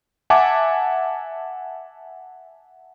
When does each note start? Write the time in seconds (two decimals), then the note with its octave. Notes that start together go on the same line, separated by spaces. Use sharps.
0.30 E5 F#5 G#5 A5 D6